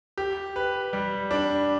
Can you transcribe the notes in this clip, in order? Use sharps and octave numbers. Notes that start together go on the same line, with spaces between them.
G4
B4
G3
D4